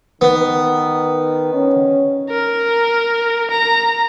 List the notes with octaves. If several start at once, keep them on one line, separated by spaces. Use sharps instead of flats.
D#3 B3
C#4
A#4
A#5